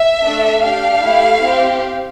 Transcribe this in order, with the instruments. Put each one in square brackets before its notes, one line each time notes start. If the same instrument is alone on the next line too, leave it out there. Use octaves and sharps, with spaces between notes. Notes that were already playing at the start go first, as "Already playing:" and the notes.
Already playing: [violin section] E5
A3 D4 A4
D4 G4 F5
A3 E4 G4
C4 G4